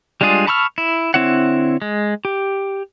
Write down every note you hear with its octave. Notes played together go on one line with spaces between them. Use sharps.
G3 G#3 D4 F4 G#4
A5 B5 C#6 E6 F6
E4
D3 C4 E4 C#5 F#5
G#3
G4